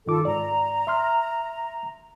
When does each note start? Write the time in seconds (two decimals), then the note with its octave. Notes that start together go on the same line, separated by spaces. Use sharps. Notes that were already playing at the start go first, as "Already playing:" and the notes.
0.06 G2 D#3 F4 A4 D6
0.25 G#2 D5 A#5
0.87 E5 C6 F6